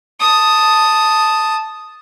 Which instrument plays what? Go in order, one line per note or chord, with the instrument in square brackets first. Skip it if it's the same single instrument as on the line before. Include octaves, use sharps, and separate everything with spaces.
[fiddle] A5 D#6